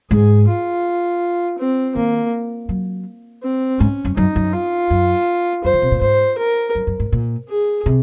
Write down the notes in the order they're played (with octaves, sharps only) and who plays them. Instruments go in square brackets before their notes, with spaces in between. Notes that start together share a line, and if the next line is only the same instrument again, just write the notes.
[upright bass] G#2 [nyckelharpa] G#4
[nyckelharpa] F4
C4
[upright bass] D#3 [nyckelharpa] A#3
[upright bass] F#3
[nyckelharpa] C4
[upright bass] G#2 [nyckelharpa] C#4
[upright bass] F#2
[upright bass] F#2 [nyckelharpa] D#4
[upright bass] F#2
[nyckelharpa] F4
[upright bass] F#2
[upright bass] F#2 [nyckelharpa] C5
[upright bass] D#3
C3
A#2
[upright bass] G#2 [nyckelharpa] C5
[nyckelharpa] A#4
[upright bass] F#2
F#2
G#2
A#2
[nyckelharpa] G#4
[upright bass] C3